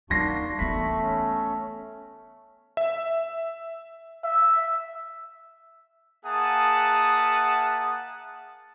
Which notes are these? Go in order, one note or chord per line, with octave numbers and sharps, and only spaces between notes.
G3 A#3 D4 D#4 F#4 C6 A#6 C7
E3 A3 B3 B5 C#6 B6
C#4
E5
E5
A#3 G#4 E5 F#5 A5 D#6